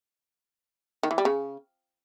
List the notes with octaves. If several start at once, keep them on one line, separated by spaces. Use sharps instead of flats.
D#3
E3
G3
C#3